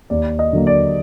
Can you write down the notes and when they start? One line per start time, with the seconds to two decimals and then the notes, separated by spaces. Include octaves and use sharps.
0.10 D#2 D5
0.39 D#5
0.53 D3 F#3 A#3
0.67 D5